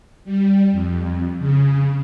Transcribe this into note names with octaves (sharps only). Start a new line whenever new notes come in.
G3
F2
C#3